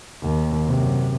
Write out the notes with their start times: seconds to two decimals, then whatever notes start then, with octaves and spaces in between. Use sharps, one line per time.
0.22 D#2
0.67 F#2 C3